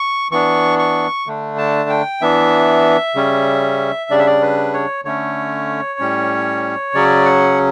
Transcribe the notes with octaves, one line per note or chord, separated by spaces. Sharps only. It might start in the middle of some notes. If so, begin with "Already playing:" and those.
Already playing: C#6
E3 B3 D4 C#6
C#6
D3 A3 D4
A5
G5
E3 B3 D4 E5
C#3 G3 C#4
C#3 G3 D4 D5
E5
D5
B4
C#5
D3 A3 C#4 C#5
A2 G3 C#4
C#3 F#3 C#4 D5
F#5